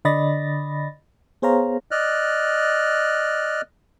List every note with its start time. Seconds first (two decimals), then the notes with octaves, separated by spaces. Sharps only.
0.05 D3 D5 D#5 B5 A6 A#6
1.42 B3 G#4 C5 C#5 F5 A#5
1.91 D5 D#5 F6 F#6